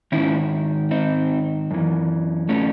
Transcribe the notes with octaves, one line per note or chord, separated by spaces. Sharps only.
G#2 D#3 C#4 E4
C4 D#4
F#2 E3
A3 C#4